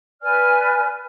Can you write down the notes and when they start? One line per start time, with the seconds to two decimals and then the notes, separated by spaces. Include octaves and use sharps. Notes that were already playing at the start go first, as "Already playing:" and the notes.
0.22 B4 D5 G#5 F6